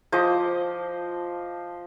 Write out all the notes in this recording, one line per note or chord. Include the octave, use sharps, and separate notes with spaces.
F3 C5 D#5 D6